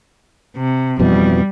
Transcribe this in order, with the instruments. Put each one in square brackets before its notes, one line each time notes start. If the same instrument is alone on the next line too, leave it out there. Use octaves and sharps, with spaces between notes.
[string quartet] C3
[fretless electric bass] F2 B2 E3 [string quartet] G3